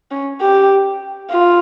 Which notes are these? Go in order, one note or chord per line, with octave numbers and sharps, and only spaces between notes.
C#4
G4
F4